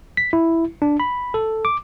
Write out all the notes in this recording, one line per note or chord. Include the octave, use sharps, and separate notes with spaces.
B6
E4
D4
B5
A4
D6